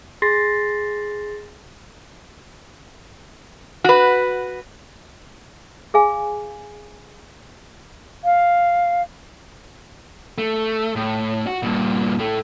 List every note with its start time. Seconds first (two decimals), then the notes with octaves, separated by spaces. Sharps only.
0.22 G#4 C6 A6 A#6 C7
3.84 F#4 B4
5.94 G#4 F5 G#5
8.24 F5
10.38 A3
10.96 A2
11.47 F#4
11.63 G2 A#2
12.19 A2 A3